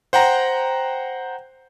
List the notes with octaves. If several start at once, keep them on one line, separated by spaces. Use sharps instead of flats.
C5 F#5 G5 A#5